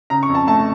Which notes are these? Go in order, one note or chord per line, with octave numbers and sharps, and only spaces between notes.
C#3 A#5
C#6
F2
A5
A3 A5